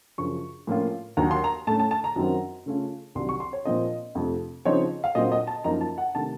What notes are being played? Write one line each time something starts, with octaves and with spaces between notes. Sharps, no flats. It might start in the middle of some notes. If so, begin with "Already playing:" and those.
F#2 C#3 F3 C#6
A2 F3 A#3 C#4 F4
D#2 D#3 F#3 A#5
C6
A#5
A2 A3 C#4 A5
A5
A5
A#5
F#2 D#3 F#3 C4
C#3 A3 C#4 F4
C2 C3 D#3 F#3 C6
C#6
C6
C#5
A#2 F3 C4 F4 D#5
F2 C3 F3 A3
C#3 F3 C4 D#4 C#5
F5
A#2 F#3 C4 D#5
D#5
A5
F#2 F3 A#3 D#4 A#5
A5
F#5
C3 D#3 A3 A5